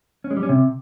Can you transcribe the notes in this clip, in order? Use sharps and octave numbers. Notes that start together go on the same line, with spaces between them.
C#4
G#3
G3
C#4
C3